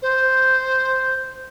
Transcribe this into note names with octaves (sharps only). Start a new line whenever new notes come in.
C5